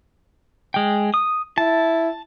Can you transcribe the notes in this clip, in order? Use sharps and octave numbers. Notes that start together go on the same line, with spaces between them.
G#3 G5
D#6
E4 A5